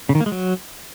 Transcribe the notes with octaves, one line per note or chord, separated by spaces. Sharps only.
C#3
D#3
A#3
G#3
F#3